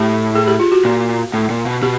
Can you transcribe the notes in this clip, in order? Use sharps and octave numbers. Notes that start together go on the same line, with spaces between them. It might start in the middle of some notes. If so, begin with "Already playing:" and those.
Already playing: A2 G4
G#4
G4
F4
F#4
A#2
A2
A#2
B2
B2 G4